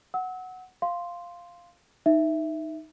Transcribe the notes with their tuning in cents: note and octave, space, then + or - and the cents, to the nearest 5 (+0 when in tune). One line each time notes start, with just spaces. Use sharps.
F#5 +0 E6 -35
F5 +0 C6 +0
D#4 +0 E5 +0